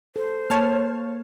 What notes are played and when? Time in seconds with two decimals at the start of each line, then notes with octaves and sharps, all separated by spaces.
0.16 A4 C5
0.50 A#3 C#5 A5 F6